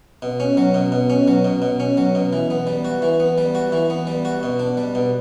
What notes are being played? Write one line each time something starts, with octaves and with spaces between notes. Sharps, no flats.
B2
C#4
F#3
B2
B2
C#4
F#3
B2
B2
C#4
F#3
B2
E3
B3
G3
F#4
E3
B3
G3
F#4
E3
B3
G3
F#4
B2
D4
G3
B2